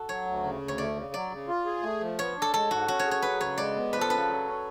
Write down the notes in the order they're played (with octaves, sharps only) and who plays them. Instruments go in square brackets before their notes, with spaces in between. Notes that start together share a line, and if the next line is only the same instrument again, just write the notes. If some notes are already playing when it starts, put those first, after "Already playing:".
Already playing: [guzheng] F#4 A4
[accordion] F#3 [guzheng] C#5
[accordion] D2
C#3
D2
[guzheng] C#5
[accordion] A3 [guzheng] D5
[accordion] C#3
[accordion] F#3 [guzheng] D5
[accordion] C#3
F4
G#4
A3
F3
[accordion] B3 [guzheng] C#5
[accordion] D4
[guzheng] A4
[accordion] G#3 [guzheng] A4
[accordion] G#2 [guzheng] F#4
[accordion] C#4 [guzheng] F#4
[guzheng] C#5
[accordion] G#4
[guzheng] C#5
[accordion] F#3 [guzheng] B4
[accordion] C#3 [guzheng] C#5
[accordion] G#3 [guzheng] D5
[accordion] B3
[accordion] F3 [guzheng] B4
[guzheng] A4
[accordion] C#3 [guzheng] B4
[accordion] F#3
C#4